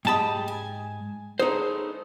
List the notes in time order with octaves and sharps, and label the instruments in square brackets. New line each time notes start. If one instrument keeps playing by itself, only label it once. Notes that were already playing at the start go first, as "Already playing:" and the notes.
[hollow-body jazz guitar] G#2 A5 B5 [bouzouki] G4 D#5
[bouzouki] G#5
[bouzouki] G#3 A3 B3 [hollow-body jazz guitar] D#4 C5